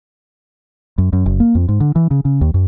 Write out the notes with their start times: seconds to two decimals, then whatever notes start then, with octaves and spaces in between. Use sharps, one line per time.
0.98 F#2
1.13 F#2
1.26 F#1
1.40 A#3
1.55 F2
1.69 G#2
1.80 D3
1.96 E3
2.11 C#3
2.25 C#3
2.41 D#2
2.54 F#2